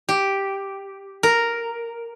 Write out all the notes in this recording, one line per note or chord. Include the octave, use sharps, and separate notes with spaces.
G4
A#4